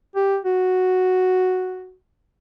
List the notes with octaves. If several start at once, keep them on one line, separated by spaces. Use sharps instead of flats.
G4
F#4